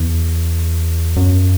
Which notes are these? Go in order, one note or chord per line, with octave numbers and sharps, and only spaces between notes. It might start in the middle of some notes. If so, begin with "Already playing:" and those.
Already playing: E2
F#2